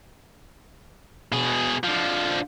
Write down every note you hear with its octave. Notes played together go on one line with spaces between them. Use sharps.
B2 G#4
D3 F3